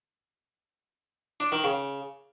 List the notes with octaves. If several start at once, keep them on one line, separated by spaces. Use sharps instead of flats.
D4
D#3
C#3